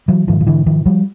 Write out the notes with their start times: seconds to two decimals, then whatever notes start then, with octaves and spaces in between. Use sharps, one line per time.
0.08 E3 F#3
0.27 G#2 D#3 F3
0.41 F3
0.47 D3 E3
0.66 D#3 F3
0.85 F3 G3